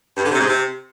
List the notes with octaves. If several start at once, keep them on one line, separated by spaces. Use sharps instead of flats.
G2
D3
C3
G#2
C3